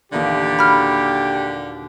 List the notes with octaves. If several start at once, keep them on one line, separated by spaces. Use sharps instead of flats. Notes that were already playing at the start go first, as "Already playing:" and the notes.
D#2 A#2 D3 E3 G4
F#4 B5 F6